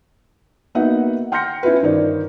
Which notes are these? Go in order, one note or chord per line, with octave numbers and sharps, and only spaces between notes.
A#3 B3 D#4 F#4 E5 F#5
G5 C6 F6 G6 A#6 C#7
C#4 E4 F4 B4
G1 D#3 C5 D5